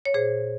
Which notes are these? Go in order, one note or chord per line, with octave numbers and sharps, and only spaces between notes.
C#5
A#2 G#4 C5